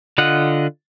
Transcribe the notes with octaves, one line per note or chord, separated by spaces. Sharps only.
D3 F4 D#5 F#5